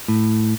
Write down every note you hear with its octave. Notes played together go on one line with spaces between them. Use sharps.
A2